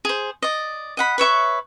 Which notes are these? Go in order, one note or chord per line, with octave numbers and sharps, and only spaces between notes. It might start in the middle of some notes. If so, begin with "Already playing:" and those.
G#4 C5
D5 D#5
D#5 F#5 B5
B4 C#5 E5 C#6